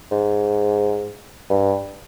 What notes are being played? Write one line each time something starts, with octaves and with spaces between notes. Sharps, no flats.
G#2
G2